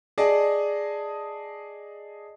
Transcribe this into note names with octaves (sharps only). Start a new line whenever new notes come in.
G#4 D5 D#5 A5